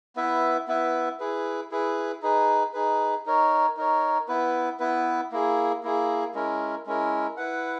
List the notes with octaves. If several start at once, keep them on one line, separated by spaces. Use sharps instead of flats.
B3 E4 B4 E5
B3 E4 B4 E5
E4 G#4 B4
E4 G#4 B4
D#4 G#4 B4
D#4 G#4 B4
D#4 A#4 C#5
D#4 A#4 C#5
B3 E4 B4
B3 E4 B4
A#3 E4 G#4
A#3 E4 G#4
G#3 C#4 E4 A#4
G#3 C#4 E4 A#4
E4 B4 F#5